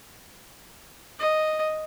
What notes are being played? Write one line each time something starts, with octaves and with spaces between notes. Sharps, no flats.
D#5